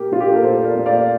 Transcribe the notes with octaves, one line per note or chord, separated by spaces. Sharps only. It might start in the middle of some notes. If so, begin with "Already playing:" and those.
Already playing: A#2 G4 A#4
A#2 F4
G4
A4
A#4
A#2 A4 C5
A#4 D5
A#2
D5 F5